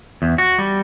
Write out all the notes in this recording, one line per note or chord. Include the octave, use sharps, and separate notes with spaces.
E2
F#4
G3